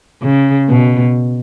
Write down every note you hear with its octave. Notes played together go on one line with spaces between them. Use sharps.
C#3
B2